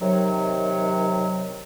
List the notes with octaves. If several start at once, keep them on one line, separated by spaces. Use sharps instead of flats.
C3 D#3 F#3